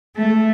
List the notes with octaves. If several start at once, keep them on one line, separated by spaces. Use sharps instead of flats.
A3